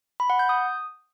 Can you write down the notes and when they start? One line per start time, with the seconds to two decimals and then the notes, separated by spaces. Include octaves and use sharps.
0.20 B5
0.30 F#5
0.39 G6
0.49 D#6